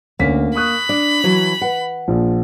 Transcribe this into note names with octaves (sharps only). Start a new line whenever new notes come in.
D2 A#3 C#4 B6
B5 C#6 D#6 F#6
D4
E3 F#3
B4 F#5
A#1 F3